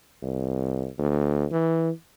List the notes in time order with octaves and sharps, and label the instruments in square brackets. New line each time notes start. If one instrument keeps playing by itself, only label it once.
[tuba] C2
D2
E3